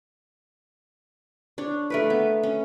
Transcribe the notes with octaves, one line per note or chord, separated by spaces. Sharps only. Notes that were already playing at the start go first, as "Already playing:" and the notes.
D4 C#5
A3 A#4 B4
B3
C#4